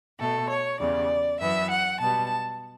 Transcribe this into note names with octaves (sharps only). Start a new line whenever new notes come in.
B2 A3 A4
C#5
E2 C#3 G3 D5
F#2 E3 B3 E5
F#5
B2 G3 B3 A5